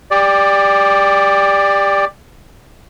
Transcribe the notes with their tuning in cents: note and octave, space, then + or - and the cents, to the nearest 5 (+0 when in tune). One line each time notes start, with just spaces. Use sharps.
G4 +25 D5 +0